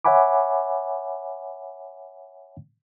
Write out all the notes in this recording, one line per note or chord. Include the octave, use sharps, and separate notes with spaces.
C#5 E5 F#5 G#5 B5 D6